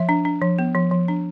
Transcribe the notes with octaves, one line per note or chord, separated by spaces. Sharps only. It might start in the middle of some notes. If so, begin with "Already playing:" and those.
Already playing: F3 E5
D4
D4
F3
B3
F3
F3
D4